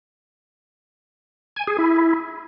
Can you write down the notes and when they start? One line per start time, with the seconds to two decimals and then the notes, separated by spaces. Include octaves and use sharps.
1.56 G#5
1.67 G#4
1.78 E4